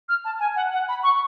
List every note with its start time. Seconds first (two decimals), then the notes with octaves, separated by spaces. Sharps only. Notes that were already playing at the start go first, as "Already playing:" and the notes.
0.09 F6
0.25 A5
0.40 G#5
0.56 F#5
0.73 F#5
0.89 B5
1.03 C#6